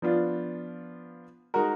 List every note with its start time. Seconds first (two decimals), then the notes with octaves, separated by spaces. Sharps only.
0.02 F3 B3 D4 F4
1.54 G#3 D#4 F#4 A#4